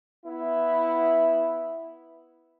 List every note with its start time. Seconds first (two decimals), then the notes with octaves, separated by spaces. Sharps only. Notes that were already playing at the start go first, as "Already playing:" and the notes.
0.25 B3 E4